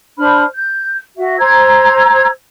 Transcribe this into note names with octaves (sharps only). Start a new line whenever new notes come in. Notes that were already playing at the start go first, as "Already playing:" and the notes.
D4 C5 B5 F6
G6
F#4 E5
C5 A#5 E6 G#6